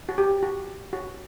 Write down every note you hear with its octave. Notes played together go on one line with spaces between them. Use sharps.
F#4
G4
F#4
F#4